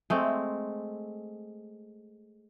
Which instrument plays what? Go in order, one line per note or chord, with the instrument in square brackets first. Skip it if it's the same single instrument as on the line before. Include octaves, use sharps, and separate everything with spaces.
[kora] G#3 A3 C4